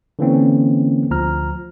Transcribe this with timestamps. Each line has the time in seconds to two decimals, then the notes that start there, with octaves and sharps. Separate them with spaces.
0.19 D3 E3 A#3 C4 C#4
1.11 D2 F3 A#5 F6